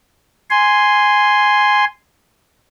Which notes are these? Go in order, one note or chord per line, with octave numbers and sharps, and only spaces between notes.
G#5 C6